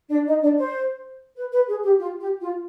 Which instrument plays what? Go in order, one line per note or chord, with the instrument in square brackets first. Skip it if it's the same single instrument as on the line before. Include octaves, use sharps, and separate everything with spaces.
[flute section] D4 D5
D#4 D#5
D4 D5
C5
B4
B4
G#4
G4
F4
G4
F4